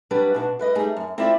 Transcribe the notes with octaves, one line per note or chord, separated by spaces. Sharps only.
F#3 G3 D4 B4
B2 D4 F#4
G3 B4 D#5
G2 G3 A3 D#4 G#4
F#2
C4 E4 F4 C5 D5 E5